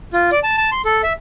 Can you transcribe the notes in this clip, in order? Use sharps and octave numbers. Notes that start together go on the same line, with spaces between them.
F4
D5
A5
A5
C6
A4
E5